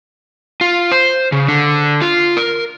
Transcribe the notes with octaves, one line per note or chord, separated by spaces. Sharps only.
F4
C5
C#3
D3
F4
A#4